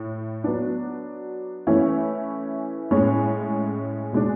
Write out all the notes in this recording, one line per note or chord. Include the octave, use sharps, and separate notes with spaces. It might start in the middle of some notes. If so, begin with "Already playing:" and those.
Already playing: A2
F#3 B3 D4
E3 A3 C#4 E4
A2 G#3 C#4
B2 G#3 D4